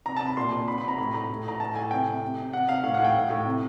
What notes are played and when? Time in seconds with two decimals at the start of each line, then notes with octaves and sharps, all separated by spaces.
0.06 C3 A#5
0.17 C3 A5
0.27 B5
0.37 A#2 C6
0.52 A#2
0.67 C3 B5
0.78 B5
0.83 C3
0.88 A#5
0.98 A2 B5
1.14 A2 A#5
1.30 A2
1.45 A2 A#5
1.60 A2 A5
1.76 A2 G#5
1.91 C3 G5
2.07 C3
2.22 C3
2.38 C3
2.53 C3 F#5
2.69 C3 F5
2.83 A2 F5
2.94 F#5
3.00 A2 G5
3.15 A2
3.30 A2
3.45 C3